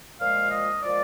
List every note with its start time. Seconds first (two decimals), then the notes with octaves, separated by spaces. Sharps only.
0.20 A#2 F3 G#3 F5
0.51 D#5
0.83 A#2 F3 G#3 D5